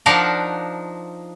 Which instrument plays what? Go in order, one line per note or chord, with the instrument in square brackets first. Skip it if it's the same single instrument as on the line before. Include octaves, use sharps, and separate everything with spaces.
[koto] F3 D4 D#4 A#4 F5 F#5